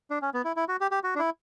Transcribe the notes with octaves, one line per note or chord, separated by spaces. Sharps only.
D4
C#4
B3
E4
E4
F#4
G4
G4
F#4
D4
E4